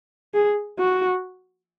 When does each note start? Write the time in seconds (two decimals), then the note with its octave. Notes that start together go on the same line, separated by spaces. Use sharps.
0.34 G#4
0.79 F#4